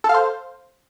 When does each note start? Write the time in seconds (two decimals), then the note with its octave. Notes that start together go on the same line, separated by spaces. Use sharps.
0.04 A4
0.09 F5
0.14 C5